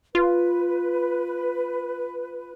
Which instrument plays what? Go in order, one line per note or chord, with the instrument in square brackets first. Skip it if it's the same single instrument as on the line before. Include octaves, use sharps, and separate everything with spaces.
[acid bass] F4 [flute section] B4